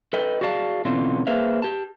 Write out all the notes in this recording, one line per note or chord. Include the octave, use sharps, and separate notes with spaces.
A4 B4 D#5 G5
F#4 G#4 D5 F5 A5
B2 D3 E3 C4 C#4 F4
A#3 G#4 B4 C5 E5 F5
G4 A5